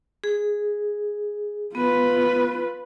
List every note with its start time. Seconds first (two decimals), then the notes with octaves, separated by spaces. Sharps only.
0.24 G#4
1.75 B3 F4 B4